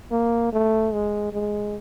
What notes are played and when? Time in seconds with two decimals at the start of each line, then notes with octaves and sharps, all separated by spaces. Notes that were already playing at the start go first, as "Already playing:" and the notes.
0.12 A#3
0.53 A3
0.93 G#3
1.33 G#3